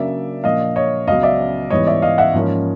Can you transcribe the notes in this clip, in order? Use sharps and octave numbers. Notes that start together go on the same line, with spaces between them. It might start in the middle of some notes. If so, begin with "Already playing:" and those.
Already playing: C#3 F#3 A#3 D4 D5 E5
A#2 F3 A#3 D4 D#5 F5
C#5 D#5
C#2 C#3 F#3 B3 D#5 F5
D5 E5
G#2 E3 G3 B3 C#5 D#5
D5 E5
D#5 F5
E5 F#5
G#2 F3 A#3 C#4